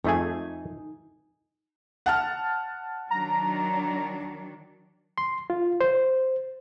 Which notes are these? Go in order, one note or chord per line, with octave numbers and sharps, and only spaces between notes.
F2 A3 D#4 G#4 G#5
F#5 A5 F6
D#3 F#3 D4 A#5
C6
F4
C5